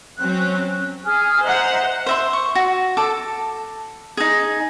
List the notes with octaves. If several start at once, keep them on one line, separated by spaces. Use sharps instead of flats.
F#3 C4 C#4 F#6
G#4 G#5 F6
C5 D#5 E5 F#5 A#5
C5 E5 C6
C#6
F#4
A4 A5 D6
D#4 G#4